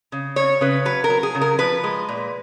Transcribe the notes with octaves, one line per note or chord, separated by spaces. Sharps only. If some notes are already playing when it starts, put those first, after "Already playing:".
C#3
C#3 C#5
C#3 B4
F#3 B4
A#4
F#3
G#4
C#3
A#4
F3 B4
G#3
A#2